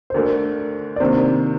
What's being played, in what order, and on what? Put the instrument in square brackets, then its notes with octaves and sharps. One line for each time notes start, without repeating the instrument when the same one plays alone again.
[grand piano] C5
[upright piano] D2 D3 A3 [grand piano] A#4
[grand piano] D5
[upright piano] C3 D#3 A#3 D4 [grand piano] C5